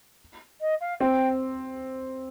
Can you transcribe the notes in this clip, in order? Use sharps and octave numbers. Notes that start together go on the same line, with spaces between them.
D#5
F5
C4 G5